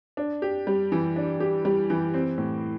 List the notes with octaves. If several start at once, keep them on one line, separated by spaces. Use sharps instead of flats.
D4
G4
G3
E3
D4
G4
G3
E3
C4
A2